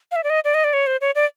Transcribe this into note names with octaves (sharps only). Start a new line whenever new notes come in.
F5
E5
D5
D#5
D5
D#5
D5
C#5
C5
C#5
D5